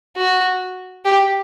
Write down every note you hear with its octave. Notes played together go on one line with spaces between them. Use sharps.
F#4
G4